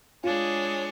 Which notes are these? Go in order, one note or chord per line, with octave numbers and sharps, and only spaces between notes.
G#3 D4 F4 G#4 C#5